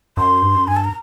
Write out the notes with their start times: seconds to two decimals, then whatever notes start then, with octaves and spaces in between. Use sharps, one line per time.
0.17 F#2 C6
0.42 G2
0.55 F#2
0.67 G2 G#5
0.76 A5
0.84 A#5